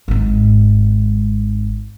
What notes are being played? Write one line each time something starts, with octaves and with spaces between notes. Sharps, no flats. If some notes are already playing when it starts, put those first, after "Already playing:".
G#1 G#2